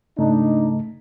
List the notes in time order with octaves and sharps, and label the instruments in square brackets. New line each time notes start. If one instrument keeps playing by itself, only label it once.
[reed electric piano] G#2 C#3 A3 [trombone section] D4 D#4